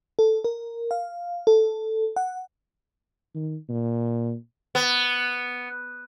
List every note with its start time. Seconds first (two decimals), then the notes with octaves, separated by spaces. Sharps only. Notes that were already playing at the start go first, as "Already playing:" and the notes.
0.19 A4
0.44 A#4
0.91 F5
1.47 A4
2.16 F#5
3.35 D#3
3.69 A#2
4.75 B3